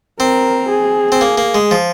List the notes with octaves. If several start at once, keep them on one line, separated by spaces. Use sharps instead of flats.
C4 A#4
G#4
C4
A#3
A#3
G#3
F3